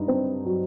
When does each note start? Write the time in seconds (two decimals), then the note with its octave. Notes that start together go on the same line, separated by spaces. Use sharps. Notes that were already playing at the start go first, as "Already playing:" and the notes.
Already playing: G2 D#4
0.08 C4
0.45 F#3